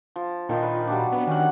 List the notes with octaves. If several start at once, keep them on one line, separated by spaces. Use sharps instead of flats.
F3
A#2 D#3 F3 D#4
B4
F#3 G3 D4
B3
D#3 C#4 F#5